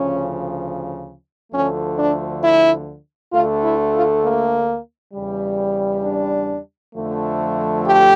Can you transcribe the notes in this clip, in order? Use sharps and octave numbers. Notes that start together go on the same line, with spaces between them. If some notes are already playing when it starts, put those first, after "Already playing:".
Already playing: D2 C#3 F3 C#4
D2 D3 F3 A3 C#4
D4
E4
D2 D3 A3 F4
E4
F4
A#3
E2 C#3 G3
D4
F2 D3 F3 A3
G4